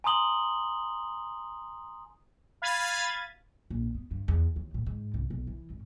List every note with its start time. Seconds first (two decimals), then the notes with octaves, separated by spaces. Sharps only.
0.04 G#5 A#5 C6 D#6 F#7 G7
2.62 F5 B5 G#6 A6 D#7
3.70 A#1
3.95 B3
4.11 G2
4.28 E2
4.56 D#2
4.74 A2
4.86 G#2
5.14 C2
5.30 B1
5.47 E3
5.70 G#1